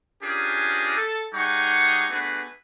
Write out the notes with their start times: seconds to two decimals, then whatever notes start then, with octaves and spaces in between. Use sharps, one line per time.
0.23 C#4 D4 F4 G4 G#4 A#4
0.97 A4
1.34 G3 D#4 G#4 F#5 C#6
2.10 A3 B3 D4 F#4 G#4 B4